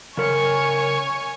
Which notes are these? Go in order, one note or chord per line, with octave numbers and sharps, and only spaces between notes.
C#3 A#4 C#5 G#5 C#6